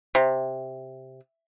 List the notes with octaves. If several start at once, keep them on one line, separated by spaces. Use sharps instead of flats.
C3